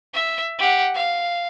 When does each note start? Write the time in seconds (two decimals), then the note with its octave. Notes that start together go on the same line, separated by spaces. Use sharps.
0.14 E5
0.59 G4 F#5
0.94 F5